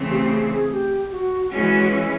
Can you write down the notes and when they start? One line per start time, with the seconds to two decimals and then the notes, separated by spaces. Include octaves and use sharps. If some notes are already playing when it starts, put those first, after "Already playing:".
Already playing: C#3 E3 A3 C4
0.10 G4
0.20 G4
0.30 G#4
0.51 G#4
0.72 G4
1.11 F#4
1.53 E3 G#3 C#4 F#4
1.88 F4
1.93 E4